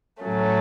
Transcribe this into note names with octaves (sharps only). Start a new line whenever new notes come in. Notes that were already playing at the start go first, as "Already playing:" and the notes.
A2 F#3 A3 C#4